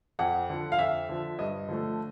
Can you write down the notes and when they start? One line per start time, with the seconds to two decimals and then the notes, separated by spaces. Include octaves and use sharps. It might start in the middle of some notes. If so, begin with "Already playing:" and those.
0.19 F2 F#5
0.50 D3 F3
0.72 F5
0.78 F2 E5
1.09 D3 F3
1.39 G2 D#5
1.69 D3 F3 A3